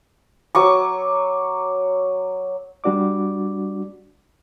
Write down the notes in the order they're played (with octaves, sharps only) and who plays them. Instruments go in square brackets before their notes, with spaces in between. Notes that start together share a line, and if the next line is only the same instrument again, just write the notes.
[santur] F#3 C#6 D6
[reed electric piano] G3 D4 F#4 D5 D6